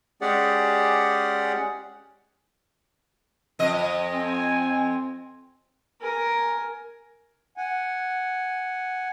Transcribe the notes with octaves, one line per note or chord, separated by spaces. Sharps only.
G#3 C#4 G4 G#4 D5 F#5
F2 D#5
C4 G#5
A#4 G#5
F#5 G#5